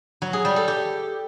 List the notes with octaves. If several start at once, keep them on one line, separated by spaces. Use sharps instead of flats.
F#3
G#4
G3
A4
G4